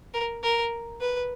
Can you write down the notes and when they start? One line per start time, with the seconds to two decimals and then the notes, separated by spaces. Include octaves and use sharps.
0.14 A#4
0.43 A#4
1.01 B4